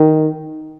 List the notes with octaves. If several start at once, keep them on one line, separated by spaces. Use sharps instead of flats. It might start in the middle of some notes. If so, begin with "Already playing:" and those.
Already playing: D#3